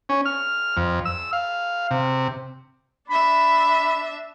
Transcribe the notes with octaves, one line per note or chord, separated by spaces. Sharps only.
C#4
F6
F2
E6
F5
C3
D4 E5 B5